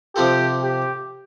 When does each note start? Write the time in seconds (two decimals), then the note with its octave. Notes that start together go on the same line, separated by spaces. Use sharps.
0.15 C3 F3 C4 F4 G4 A4
0.63 G4